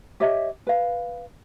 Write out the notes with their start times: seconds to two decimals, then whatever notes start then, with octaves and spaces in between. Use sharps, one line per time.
0.20 G4 C#5 D#5 E5
0.67 B4 F5